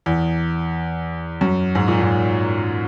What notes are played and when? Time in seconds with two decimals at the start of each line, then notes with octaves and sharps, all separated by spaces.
0.06 E2
1.41 F#2
1.75 G#2
1.88 A#2
2.01 G#2